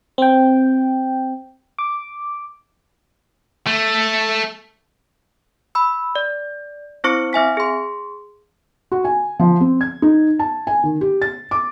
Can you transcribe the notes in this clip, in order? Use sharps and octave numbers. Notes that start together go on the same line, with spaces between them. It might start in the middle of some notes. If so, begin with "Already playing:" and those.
C4 G5
D6
A3
B5 E6
D5
C4 E4 C5 C#6 C#7
C4 E5 G#5 B6
G#4 C6
F#4
G#5
F3
C4
G#6
D#4
A5
G#5
D#3
G4
A6
D6